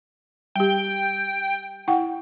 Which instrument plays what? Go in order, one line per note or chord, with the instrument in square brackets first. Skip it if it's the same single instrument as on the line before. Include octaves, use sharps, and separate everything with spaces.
[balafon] G3 G4 [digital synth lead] G5
[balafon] E4 F#5 G5